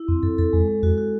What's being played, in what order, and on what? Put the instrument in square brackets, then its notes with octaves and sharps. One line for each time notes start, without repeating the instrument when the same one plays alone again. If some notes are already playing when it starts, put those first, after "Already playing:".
Already playing: [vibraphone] E4
[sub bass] F2 [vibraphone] C4
[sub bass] F#2 [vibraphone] A4
[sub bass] F2 [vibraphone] A4
[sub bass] F2 [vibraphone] G#3
[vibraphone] G#3
[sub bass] F2 [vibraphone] F#4
[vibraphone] F#4